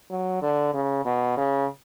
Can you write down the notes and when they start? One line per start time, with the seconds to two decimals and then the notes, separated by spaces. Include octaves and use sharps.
0.10 F#3
0.42 D3
0.73 C#3
1.05 B2
1.37 C#3